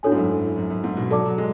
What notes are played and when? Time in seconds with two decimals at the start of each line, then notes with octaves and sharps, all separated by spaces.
0.03 A2 D4 F#4 A4 C#5 G#5
0.12 G#2
0.16 F#2
0.44 A2
0.58 F#2
0.70 F#2
0.84 G#2
0.97 B2
1.10 F#3 A4 D5 A5 D6
1.26 F#3
1.38 G#3